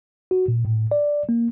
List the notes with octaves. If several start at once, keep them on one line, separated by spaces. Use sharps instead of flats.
F#4
A#2
A2
D5
A#3